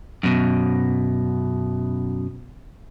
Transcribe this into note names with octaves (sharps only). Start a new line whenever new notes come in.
F#2 B2